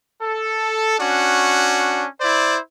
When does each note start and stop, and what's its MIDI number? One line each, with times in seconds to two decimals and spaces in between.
0.22 0.98 69
0.99 2.05 61
0.99 2.05 62
0.99 2.05 66
2.20 2.58 64
2.20 2.58 72
2.20 2.58 74